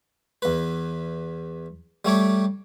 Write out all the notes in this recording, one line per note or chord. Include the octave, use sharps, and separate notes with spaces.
E2 B4
G3 A3 C#5 D6